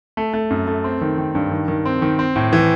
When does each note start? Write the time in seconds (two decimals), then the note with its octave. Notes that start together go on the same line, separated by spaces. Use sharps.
0.17 A3
0.34 A3
0.50 F#2
0.67 A3
0.84 C4
1.01 D#3
1.18 D#3
1.35 G2
1.52 D#3
1.68 D#3
1.85 C4
2.02 D#3
2.19 C4
2.36 A2
2.53 E3